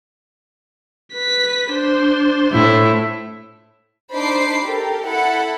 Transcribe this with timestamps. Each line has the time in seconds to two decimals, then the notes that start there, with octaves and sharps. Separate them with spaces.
1.14 B4 B6
1.72 D4 C5
2.52 A2 E4
4.13 D4 D#4 C5 B5 D6 C7
4.63 G4 A4 A#4
5.06 E4 A4 F#5 B5